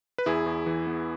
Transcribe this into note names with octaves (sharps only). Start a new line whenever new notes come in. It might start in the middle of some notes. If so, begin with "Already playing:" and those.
B4
E2 E4 G#4
E2
E3
B3